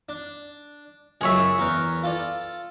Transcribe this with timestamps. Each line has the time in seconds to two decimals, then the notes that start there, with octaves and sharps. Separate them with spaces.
0.09 D4
1.21 C#2 F#2 G#4 C#5 E5
1.58 E2 A#4 B4
2.03 F4 A4 D5